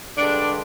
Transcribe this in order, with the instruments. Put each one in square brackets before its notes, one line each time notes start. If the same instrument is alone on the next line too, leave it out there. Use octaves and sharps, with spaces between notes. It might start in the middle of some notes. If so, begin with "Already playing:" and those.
[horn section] G2 D3 G#3 D4